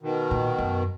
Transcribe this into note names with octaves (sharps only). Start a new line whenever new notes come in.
B2 D#3
A#2
F#2